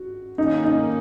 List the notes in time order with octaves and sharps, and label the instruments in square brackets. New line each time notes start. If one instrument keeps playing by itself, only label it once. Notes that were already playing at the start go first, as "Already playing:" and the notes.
Already playing: [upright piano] F#4
[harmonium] D#3 A#3 C#4 [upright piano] D#4
[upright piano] D#4